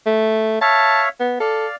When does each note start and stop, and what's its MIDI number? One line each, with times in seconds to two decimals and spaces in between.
0.06 0.59 57
0.61 1.09 73
0.61 1.09 76
0.61 1.09 77
0.61 1.02 81
1.20 1.37 59
1.40 1.66 69
1.40 1.76 74
1.40 1.76 77